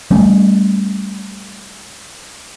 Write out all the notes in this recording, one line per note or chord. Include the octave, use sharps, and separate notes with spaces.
G3 A3 C#4